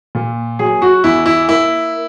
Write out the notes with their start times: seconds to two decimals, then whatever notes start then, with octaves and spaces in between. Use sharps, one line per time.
0.15 A#2
0.59 F#3 G#4
0.82 F#4
1.04 E2 E4
1.26 E4
1.48 A#3 E4